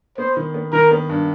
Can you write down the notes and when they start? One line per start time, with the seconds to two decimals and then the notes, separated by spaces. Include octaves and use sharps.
0.18 B3 C5
0.37 D#3
0.54 B3
0.73 D#3 A#4
0.91 B3
1.09 G2